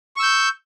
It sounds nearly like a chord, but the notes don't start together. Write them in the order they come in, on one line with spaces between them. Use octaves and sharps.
C#6 E6 G6